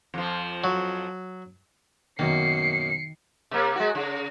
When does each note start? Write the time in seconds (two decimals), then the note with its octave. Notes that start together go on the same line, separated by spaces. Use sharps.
0.14 F2 F3
0.64 F#3
2.19 F#2 B2 D#3 A#3 C7 C#7
3.51 C3 A#3
3.76 G#3 F#4
3.95 C#3